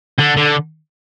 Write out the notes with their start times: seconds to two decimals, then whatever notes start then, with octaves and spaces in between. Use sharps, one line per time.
0.19 D3
0.37 D3